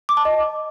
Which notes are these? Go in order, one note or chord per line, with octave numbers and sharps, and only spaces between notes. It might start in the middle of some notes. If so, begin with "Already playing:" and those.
D6
A5
D#5